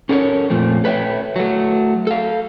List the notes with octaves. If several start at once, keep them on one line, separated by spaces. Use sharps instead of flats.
C#4 A4 A#4 C#5
F2 A#2 F3 A3 C4
A4 B4 C#5 E5 G5
F#3 A3
A4 F5